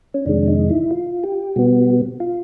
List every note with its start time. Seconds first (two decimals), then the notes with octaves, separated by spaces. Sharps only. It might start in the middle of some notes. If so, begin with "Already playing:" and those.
0.14 C#4
0.26 F2 C3 D#3 G#3 D4
0.48 D#4
0.69 E4
0.91 F4
1.23 G4
1.56 B2 G3 B3 F#4
2.20 F4